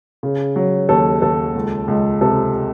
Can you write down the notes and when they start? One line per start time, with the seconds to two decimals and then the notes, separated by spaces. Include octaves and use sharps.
0.23 C#3
0.56 F#3
0.89 D#2 A4
1.22 D#2 A4
1.55 C#2
1.88 C#2
2.21 C3 A4